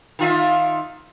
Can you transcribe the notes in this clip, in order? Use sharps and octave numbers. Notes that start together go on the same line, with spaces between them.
D#3 F4 E5